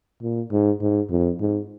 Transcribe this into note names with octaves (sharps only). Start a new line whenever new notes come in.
A#2
G#2
G#2
F2
G#2